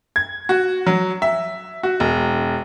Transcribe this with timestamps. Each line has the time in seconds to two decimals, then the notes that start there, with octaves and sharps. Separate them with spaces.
0.16 G#6
0.49 F#4
0.87 F#3
1.22 E5
1.83 F#4
2.00 E1